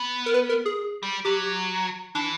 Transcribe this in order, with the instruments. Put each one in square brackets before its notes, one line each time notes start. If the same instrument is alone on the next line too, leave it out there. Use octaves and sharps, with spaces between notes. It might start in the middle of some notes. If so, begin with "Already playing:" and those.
Already playing: [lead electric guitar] B3
[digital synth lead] A#4
B4
A#4
G#4
[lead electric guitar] G3
[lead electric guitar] F#3 [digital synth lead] G4
[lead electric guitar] E3 [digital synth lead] D4